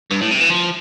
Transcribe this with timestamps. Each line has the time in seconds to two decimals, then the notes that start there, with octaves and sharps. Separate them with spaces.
0.11 G2
0.21 A2
0.31 C3
0.40 E3
0.50 F3